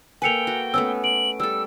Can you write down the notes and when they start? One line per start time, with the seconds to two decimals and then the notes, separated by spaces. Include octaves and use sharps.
0.22 A#3 A4 B4 G5 G#5 C#7 F7
0.47 F#4
0.74 A3 B3 C#4 E6
1.04 D7 F#7
1.40 G3 A4 E6